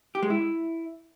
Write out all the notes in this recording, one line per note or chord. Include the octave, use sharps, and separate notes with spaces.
G4
G#3
E4